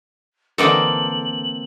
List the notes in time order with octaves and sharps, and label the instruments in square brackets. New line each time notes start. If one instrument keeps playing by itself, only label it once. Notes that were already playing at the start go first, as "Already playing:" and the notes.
[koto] D3 E3 D#4 [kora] A#3 C4 A4 [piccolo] F#7